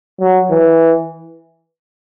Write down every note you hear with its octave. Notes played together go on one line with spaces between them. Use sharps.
F#3
E3